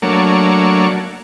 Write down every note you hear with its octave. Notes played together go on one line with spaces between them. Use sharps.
F#3 A3 A#3 D4 C#5